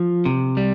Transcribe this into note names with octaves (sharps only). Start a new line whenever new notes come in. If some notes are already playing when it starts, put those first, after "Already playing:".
Already playing: F3
C3
G3